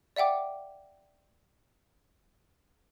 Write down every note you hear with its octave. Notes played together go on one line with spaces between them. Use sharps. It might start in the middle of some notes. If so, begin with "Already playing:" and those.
D5 E5 F#5 G5 D6